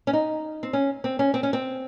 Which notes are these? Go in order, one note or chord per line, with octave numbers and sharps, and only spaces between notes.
C#4
D#4
C4
C#4
C4
C#4
C4
C#4
C4